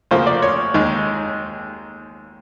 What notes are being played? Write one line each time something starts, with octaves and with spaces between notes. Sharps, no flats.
D2 C#3 F3 A#3 C5
D5
C#5
D#2 D#3 G#3